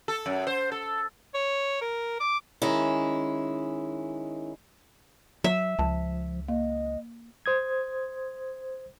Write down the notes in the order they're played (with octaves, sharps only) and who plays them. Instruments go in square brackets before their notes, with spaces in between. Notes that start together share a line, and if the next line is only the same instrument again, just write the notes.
[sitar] A4
F#2
C5
A4
[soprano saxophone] C#5
A#4
D6
[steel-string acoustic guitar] D#3 G#3 C#4 E4
[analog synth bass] F#3 [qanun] E5
[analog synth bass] C#2 [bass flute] F3 [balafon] A5
[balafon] A#3 [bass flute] D#5
[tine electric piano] C5 D#6 G#6